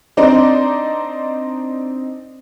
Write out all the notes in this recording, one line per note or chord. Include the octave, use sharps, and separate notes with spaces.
C4 D4 D#4 C5 D5